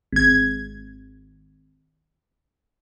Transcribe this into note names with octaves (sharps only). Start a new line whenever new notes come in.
G#1 G#6